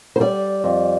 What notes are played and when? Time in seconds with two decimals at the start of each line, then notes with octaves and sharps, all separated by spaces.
0.16 C5
0.20 G3 D5
0.64 F2